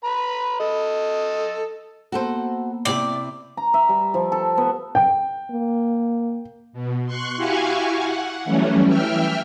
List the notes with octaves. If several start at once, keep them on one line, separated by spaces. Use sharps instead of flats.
B4 A#5 B5
A4 D#5
A#3 B3 F#4 A4 C5
C3 E4 G4 D5
A#5
E5
G3
F3
A4
B3
G5
A#3
B2
C6 C#6 F#6
E4 F#4 G4 F5 G#5 C#6
F#5
E3 F#3 G3 A3 C#4
E3 E5 G5 F6